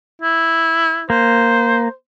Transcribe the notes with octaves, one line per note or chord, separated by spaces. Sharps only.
E4
A#3 C5